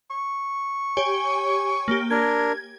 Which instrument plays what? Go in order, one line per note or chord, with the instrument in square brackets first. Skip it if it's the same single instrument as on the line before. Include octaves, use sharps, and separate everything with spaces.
[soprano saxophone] C#6
[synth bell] G4 C#5 G#5
A#3 G4
[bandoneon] D4 A#4 [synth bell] G#6